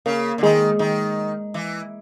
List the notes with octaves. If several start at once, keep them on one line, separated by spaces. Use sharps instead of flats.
C#3 A#3
D3
D#3 G#3
D#3 G#3
E3